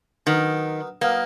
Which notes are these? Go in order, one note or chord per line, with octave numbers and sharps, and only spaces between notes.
D#3 F#3 B3 D#4 A#4
F#3 A#3 B3 D#4 A#4